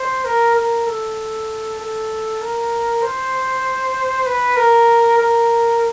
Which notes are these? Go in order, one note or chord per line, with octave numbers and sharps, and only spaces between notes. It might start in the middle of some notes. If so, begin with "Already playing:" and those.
Already playing: C5
A#4
A#4
A4
A4
A#4
C5
B4
A#4
A#4